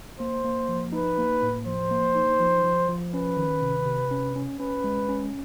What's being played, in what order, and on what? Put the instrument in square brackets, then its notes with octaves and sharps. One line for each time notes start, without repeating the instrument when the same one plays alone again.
[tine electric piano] A#3 [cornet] C5
[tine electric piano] A#3
F3
[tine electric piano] D#4 [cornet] B4
[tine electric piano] A#3
A2
[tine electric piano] F3 [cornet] C5
[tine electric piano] A#3
D#4
F3
F3
F3
[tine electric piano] C#4 [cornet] B4
[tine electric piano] D#3
C3
C3
C#4
C#4
[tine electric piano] C#4 [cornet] B4
[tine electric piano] G#3
C#4